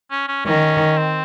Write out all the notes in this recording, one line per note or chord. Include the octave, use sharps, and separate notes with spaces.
C#4
C#4
D#3 C#4
C4